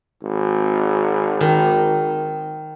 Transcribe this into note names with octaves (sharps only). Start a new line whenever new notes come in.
G#1
D#3